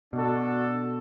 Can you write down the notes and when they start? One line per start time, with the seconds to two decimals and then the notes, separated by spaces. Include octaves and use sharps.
0.13 B2 D4 F#4 A4